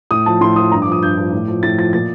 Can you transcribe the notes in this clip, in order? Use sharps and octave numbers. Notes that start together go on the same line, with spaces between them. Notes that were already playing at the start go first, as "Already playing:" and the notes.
A2 D#6
F3 A5
A2 C6
F3 D#6
G2 A#5
D6
F3
D#6
G2 G6
F3
A2
F3
A2 A6
F3 A6
A#2 A6